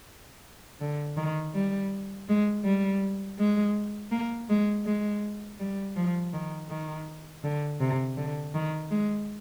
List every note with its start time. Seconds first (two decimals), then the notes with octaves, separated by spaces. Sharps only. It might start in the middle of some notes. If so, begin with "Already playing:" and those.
0.81 D3
1.17 D#3
1.54 G3
2.28 G#3
2.64 G3
3.39 G#3
4.11 A#3
4.49 G#3
4.85 G#3
5.60 G3
5.96 F3
6.33 D#3
6.70 D#3
7.44 D3
7.80 C3
8.17 D3
8.54 D#3
8.91 G#3